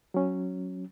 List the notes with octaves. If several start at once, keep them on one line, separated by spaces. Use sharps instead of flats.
F#3 C#4